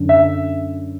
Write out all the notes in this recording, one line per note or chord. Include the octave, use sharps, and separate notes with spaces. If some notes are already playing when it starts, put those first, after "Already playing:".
Already playing: F#2 D3
E5